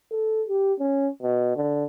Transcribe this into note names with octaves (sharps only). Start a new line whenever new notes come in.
A4
G4
C#4
B2
D3